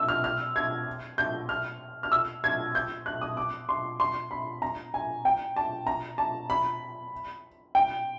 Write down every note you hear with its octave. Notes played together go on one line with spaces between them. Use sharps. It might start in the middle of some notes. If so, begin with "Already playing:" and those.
Already playing: E6
F6
F6
G#6
G6
F6
F6
E6
G#6
G6
F#6
D#6
D6
C6
C6
B5
A#5
G#5
G5
A5
A#5
A5
B5
G5